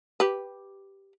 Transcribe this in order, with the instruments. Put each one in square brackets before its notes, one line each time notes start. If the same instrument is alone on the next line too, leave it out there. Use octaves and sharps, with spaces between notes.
[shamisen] G4 B4